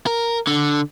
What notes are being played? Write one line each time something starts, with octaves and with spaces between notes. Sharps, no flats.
A#4
D3